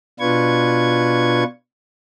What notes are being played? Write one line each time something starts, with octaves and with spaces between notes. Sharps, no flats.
B2 D4 F4 B4 C#6 G#6